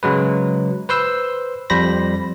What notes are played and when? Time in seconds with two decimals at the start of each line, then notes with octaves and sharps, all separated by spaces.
0.03 C#3 F#3 G#3 B4
0.89 B4 C5 C6 E6
1.70 F2 G3 C5 B5 A#6